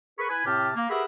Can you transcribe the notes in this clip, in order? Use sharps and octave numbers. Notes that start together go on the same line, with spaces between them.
G#4 A#4 B4 B5 C#6
E4 B4 G#5
A2 C3 C4 G4 A5 F6
A#3
G4 G#4 A#4 B4 E5 F#5